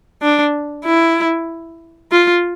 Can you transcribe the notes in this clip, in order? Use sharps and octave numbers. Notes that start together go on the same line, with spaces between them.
D4
E4
F4